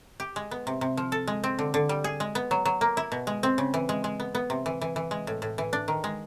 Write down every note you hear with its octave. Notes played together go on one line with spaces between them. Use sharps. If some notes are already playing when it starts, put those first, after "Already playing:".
G4
G#3
B3
C3
C3
F3
A4
G#3
C4
D3
D3
G3
G#4
G#3
B3
F#3
F#3
A#3
E4
B2
G#3
C4
C#3
E3
G#3
G#3
B3
B3
C3
E3
E3
E3
G#3
A2
A2
E3
D4
D#3
G#3